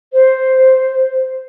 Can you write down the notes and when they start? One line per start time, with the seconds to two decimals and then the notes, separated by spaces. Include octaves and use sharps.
0.13 C5